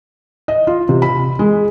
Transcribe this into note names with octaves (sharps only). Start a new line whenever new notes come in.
D#5
F4
C3
B5
G#3